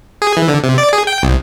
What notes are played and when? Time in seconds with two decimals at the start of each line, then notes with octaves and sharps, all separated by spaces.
0.22 G#4
0.37 E3
0.49 D3
0.64 C3
0.78 D5
0.93 G#4
1.07 G5
1.23 C2